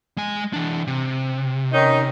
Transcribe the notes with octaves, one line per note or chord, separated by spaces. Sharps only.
G#3 G#5
E3 D4
C3
D#3 C#4 D#4